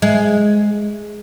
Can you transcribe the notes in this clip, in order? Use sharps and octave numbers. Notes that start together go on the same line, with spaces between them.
G#3